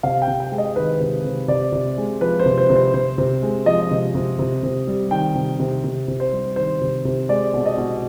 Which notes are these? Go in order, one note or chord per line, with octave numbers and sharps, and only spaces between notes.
C3 F5
G5
C3
G5
G#3
D#5
D#3 B4
C3
C3
C3 D5
C3
G#3
F3 B4
C5
C3
C5
C3
C5
C3 C5
C3
G#3
F3 D#5
C3
C3
C3
C3
G3
D#3 G5
C3
C3
C3
C3
C5
G3
D#3 C5
C3
C3
G#3 D5
B2
D#5
B2